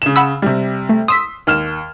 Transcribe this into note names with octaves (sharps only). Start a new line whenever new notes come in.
C#3 E7
F#5 B5 E6
C3 G3
A3
C6 D#6 E6 B6
D#2 F6 E7